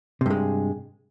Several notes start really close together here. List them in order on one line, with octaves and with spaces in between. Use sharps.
C3 G2 G#3